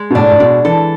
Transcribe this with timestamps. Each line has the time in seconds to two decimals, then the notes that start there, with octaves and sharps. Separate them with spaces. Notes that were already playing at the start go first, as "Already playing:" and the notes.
Already playing: G#3
0.10 B2
0.15 A2 D4
0.31 A2
0.40 B2 G#3
0.65 E3 A4